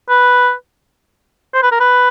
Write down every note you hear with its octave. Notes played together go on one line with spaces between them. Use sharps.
B4
C5
B4
A#4
B4